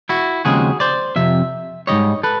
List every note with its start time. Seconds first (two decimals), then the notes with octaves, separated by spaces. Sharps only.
0.09 E4 F#4
0.45 D#2 C#3 F3 G#3 C4 F#4 G#4
0.80 C5 D5
1.16 F2 C3 E5
1.87 G#2 D#3 G3 C#5 D#5
2.23 A4 B4